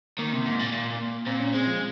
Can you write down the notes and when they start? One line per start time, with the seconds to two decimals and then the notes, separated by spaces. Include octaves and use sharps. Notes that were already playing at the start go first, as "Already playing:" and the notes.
0.18 D#3 A#3
0.33 C3
0.46 G#2
0.59 A#2
0.72 A#2
1.26 A#2 C4
1.40 C#4
1.54 G#3 C4
1.67 F3